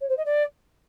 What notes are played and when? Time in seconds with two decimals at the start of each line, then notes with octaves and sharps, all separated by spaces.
0.01 C#5
0.09 C5
0.17 D#5
0.25 D5